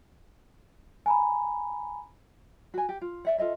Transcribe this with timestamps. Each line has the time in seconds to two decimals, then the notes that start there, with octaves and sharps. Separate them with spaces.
1.06 G#5 A#5 B5
2.74 F#4 G#5
2.89 G4
3.01 F4
3.25 D5 E5 F#5
3.38 F4 A4 D#5 E5